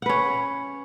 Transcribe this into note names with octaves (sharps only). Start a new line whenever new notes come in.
C#4 B4 F#5